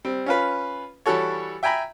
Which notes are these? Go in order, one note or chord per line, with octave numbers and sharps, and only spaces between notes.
G3 C4
C#4 F4 B4
E3 G3 F#4 A4 C#5
E5 G5 G#5 A#5 B5